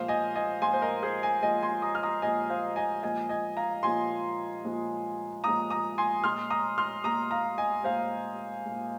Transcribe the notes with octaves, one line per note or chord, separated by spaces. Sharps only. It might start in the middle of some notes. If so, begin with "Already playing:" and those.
Already playing: A#2 F3 G#3 C5 F5
D#5 G#5
D#5 G#5
A#2 F3 G#3 G#5 C6
C5
A#4 D#5
G#4 C5
D#5 G#5
A#2 F3 G#3 D#5 G#5
G#5 C6
A#5 D#6
F6
A#5 D#6
A#2 F3 G#3 D#5 G#5
C5 F5
D#5 G#5
A#2 F3 G#3 D#5 G#5
D#5 G#5
F5 A#5
A#2 F3 G#3 G#5 C6
A#2 F3 G#3
A#2 F3 G#3 A#5 D#6
A#5 D#6
G#5 C6
A#2 G#3 C6 F6
A#5 D#6
C6 F6
A#2 G#3 A#5 D#6
F5 A#5
D#5 G#5
A#2 G#3 C5 F5
A#2 G#3